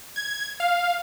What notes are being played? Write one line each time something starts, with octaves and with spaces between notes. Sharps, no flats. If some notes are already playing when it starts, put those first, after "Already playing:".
G#6
F5